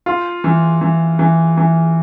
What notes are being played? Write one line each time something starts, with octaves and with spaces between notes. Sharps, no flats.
F4
E3
E3
E3
E3